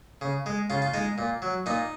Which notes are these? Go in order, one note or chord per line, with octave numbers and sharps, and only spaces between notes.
C#3
G#3
C#3 F4
F4
G#3 D#4
A#2
F#3
A#2 D#4